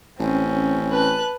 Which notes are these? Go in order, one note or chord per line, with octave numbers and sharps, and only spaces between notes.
A1 C4 C#4
B4 A5 F#6